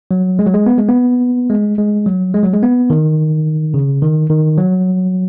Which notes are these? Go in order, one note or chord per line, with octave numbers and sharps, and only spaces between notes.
F#3
G#3
F#3
G#3
B3
G#3
B3
G#3
G#3
F#3
G#3
F#3
G#3
B3
D#3
C#3
D#3
D#3
F#3